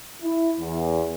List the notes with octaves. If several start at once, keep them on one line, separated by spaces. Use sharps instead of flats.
E4
E2